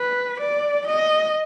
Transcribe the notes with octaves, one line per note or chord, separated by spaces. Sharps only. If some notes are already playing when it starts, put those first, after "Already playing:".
Already playing: B4
D5
D#5